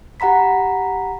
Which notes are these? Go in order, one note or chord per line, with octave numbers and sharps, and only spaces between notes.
G4 F#5 A#5 B5 B6